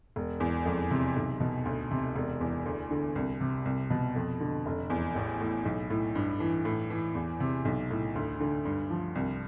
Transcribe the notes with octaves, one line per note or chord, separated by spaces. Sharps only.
E1
E2
F2
C3
B1
B2
D2
C3
E1
E2
D2
D3
C2
C3
C2
B2
F2
D3
F1
E2
A1
A2
B1
A2
G2
E3
A2
E3
E2
C3
B1
A2
D2
D3
G2
F3
C2